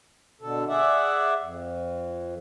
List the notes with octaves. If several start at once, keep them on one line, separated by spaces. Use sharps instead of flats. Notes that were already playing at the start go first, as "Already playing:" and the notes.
B2 D3 A4
G#4 D5 E5 F#5
F2